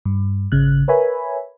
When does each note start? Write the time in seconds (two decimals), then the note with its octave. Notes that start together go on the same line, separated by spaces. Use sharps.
0.05 G2
0.52 G#1 C#3 F#6
0.88 A#4 B4 C#5 E5 G#5 B5